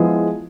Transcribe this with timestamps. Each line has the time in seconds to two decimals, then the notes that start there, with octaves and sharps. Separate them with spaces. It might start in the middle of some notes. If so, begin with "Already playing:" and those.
Already playing: F3 G#3 B3 E4 G#4